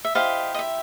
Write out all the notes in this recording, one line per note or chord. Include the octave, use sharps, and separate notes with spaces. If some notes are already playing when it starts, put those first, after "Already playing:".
E5
E4 G4 C5 D#5 F5
D#5
E5